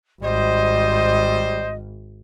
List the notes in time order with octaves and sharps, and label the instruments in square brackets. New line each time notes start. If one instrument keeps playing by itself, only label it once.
[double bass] G#1 [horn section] G3 C5 [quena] D#5